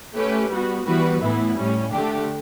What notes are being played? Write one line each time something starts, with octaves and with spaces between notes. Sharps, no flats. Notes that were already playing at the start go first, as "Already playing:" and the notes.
A3 C#4 G4 B4
G3 B3 F#4
E3 G3 B3 F#4 B4
A2 E3 B3 E4
A2 G3 C#4
D3 A3 D4 G4